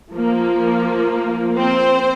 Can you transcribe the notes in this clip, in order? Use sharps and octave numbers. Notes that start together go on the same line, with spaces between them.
F3 A#3
C4 C5